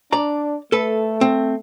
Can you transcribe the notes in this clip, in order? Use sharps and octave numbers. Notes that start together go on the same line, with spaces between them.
D4 D5 A#5
A3 A4 B4
C4